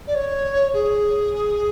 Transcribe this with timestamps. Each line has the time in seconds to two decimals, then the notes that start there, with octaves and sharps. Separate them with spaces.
0.07 D5
0.15 C#5
0.73 G#4